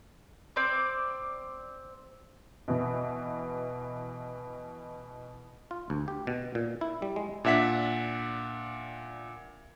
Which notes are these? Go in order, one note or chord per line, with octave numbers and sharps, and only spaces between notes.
C4 D5
B2 E3
F4
D2
G4
B2
A#2
E4
G3
G#3
A#2 D4 E5 F#5 B6